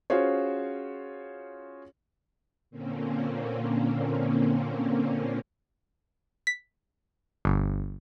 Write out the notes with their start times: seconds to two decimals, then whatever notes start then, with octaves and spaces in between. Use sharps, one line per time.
0.10 C#4 F4 F#4 G#4 C5 C#5
2.70 A#2 D3 A#3 C4 C#4
6.47 B6
7.45 G1